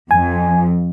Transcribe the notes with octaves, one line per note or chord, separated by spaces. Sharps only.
F2 G#5